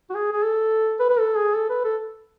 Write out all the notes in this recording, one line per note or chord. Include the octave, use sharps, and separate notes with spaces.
F#4
G#4
G#4
A4
B4
B4
A4
G#4
A4
B4
A4